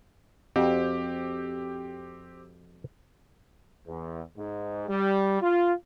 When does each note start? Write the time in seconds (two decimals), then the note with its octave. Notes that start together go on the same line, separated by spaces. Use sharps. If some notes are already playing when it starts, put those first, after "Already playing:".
0.56 F2 C4 F#4 G4
3.87 E2
4.37 G#2
4.87 G3
5.41 F4